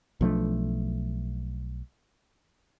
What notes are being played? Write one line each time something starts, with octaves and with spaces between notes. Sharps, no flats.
B1 F3 A3 D4